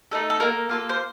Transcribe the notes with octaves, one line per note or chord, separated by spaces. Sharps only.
A3 D#4 A4
A4
A#3 F4 A4 A#4
A#3 F4 A4
C5